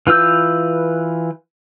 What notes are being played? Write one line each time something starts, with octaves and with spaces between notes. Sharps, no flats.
E3 F4 B4 E6 G6